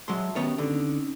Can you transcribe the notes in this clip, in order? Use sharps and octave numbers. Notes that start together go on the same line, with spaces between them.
F#3 G#3 E5 A5 C6
D#3 B3 C#4 F#4 G4 C#5
D3 C4 C#4 D#4